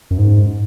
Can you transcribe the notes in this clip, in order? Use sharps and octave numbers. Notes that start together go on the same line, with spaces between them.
F#2
G#2